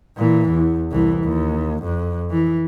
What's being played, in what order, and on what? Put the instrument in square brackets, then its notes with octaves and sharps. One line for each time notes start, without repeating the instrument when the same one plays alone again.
[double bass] A#2 E3
E2
C2 E3
D#2
F2
E3